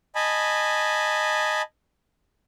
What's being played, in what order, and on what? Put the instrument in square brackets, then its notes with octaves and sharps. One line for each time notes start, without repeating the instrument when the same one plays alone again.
[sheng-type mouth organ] D#5 G#5 A5 B5